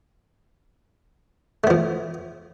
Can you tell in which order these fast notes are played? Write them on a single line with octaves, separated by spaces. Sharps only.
A3 B3 F3